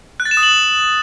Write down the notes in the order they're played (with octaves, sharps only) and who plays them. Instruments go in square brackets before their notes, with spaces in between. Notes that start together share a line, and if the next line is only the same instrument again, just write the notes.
[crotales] F#6
A6
E7
D#6
F#7